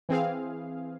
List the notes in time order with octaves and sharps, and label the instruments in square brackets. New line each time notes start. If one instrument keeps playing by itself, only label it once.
[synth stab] E3 C4 G#4 F5